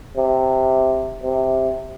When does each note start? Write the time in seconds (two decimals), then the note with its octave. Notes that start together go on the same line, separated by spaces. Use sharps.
0.16 C3
1.23 C3